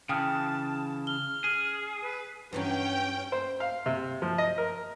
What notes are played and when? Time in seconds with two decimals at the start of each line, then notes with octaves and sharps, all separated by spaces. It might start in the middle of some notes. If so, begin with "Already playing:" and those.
0.09 C#3 E3 G5 A5 D#6 F6
1.07 F6 G7
1.44 G#4
2.02 B4
2.53 G2 E3 F#3 C#4 G5
3.32 C5
3.60 F5
3.86 C3
4.22 F3
4.38 D#5
4.58 A#4